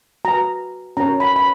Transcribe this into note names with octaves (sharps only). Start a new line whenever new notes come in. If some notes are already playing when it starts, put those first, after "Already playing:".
F#4 B4 A#5
C#4 F#4 A#4 C#5 A#5
B5
B5